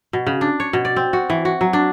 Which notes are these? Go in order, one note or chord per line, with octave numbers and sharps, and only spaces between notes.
B2
C#3
D4
C#5
B2
D5
C4
F#4
E3
F#4
F#3
D4